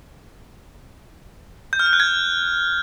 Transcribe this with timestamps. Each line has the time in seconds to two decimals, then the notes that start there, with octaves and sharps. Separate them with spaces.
1.73 G6
1.80 F6
1.86 G6
1.93 F#6
2.00 G#6